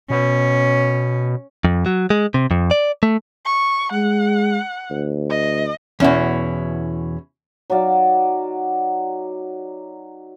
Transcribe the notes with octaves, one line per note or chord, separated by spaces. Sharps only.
B2 C#4
F2
F#3
G#3
C3
F2
D5
A3
C#6
G#3 F#5
D2
D#5
E2 B2 C#4 E4 F#4
F#3 D#4 D5 F5